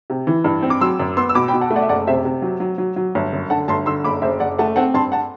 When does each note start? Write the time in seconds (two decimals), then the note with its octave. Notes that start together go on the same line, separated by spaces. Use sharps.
0.10 C3
0.27 E3
0.44 G2
0.62 C4
0.70 D6
0.80 F#3 C6 E6
1.00 F#2
1.17 B3 C6 E6
1.29 E6
1.34 B2 B5 D6
1.48 G5 B5
1.53 B2
1.61 F#5 A5
1.70 A3
1.76 D5 F#5
1.82 E5
1.89 F#1 D5 F#5
2.07 C3 C5 E5
2.25 C3
2.42 F#3
2.60 F#3
2.78 F#3
2.96 F#3
3.15 G1
3.33 F#2
3.50 D3 F#5 A5
3.68 G1 A5 C6
3.86 D3 C6 E6
4.04 F#1 B5 D6
4.22 F#1 C5 E5
4.40 F#1 D5 F#5
4.58 A3 F#5 A5
4.76 C4 F#5 A5
4.94 G2 A5 C6
5.12 F#5 A5